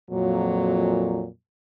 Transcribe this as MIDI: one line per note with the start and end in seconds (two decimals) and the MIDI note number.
0.11 1.26 41
0.11 1.26 46
0.11 1.26 54